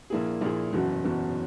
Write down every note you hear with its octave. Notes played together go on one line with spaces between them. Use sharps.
A#1 A#2 A#3 E4 G#4
A#1 A#2 A#3 E4 G#4
F#1 E2 B2 F#3 C#4
F#1 E2 B2 F#3 C#4